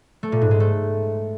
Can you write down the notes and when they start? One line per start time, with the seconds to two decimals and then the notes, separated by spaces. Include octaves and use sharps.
0.23 A3
0.32 A#2
0.41 G#2
0.51 G#3
0.60 A3